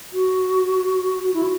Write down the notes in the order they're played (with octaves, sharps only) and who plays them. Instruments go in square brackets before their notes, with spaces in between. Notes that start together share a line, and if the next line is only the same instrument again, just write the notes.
[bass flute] F#4
F#4
E4
F#4